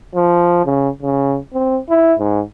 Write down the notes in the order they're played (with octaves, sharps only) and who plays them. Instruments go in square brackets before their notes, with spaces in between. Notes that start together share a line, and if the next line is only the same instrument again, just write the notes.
[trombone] F3
C#3
C#3
C4
E4
G#2